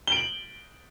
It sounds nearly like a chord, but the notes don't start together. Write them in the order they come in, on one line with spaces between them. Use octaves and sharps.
G7 D7 F#7